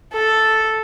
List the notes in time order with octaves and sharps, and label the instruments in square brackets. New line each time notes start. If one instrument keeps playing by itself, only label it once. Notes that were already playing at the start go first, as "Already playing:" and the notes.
[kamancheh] A4